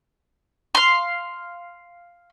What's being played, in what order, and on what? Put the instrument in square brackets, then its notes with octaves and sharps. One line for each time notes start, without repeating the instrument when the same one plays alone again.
[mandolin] F5 C6